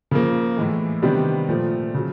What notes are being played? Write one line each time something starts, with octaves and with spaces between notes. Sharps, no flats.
C#3 F3 A#3
A2 E3 G#3
C3 D#3 G3 B3 D4
A#2 F3 A3
C#3 F#3